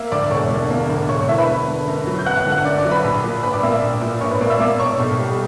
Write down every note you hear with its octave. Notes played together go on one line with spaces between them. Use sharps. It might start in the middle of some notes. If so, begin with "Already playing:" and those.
Already playing: A#3 E5 E6
D2 D5 D6
E1 C#5 C#6
D3
A#3
D2
E1 C#5 C#6
C#5 C#6
D3 E4 E5
B4 B5
B3
D3
F#2
F#3
G6
B3 F#5 F#6
F#5 F#6
D3
F#5 F#6
F#2 D5 D6
D5 D6
F#3
B4 B5
A#1
A#2
A#1 B4 B5
D5 D6
A#3 E5 E6
D5 D6
A#1
A#2
A#1 C#5 C#6
B4 B5
A#3 D5 D6
E5 E6
A#3 D5 D6
B2 C#5 C#6
B1
G3